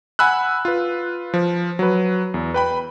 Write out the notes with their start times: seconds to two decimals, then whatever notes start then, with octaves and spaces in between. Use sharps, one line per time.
0.19 F#5 G#5 B5 E6 F#6
0.65 F4 B4
1.34 F3
1.79 F#3 B4
2.34 E2
2.54 B4 G5 B5